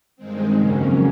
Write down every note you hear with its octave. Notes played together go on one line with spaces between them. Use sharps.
G2 D#3 G#3 C4
F2 C#3 F#3 A#3 C#4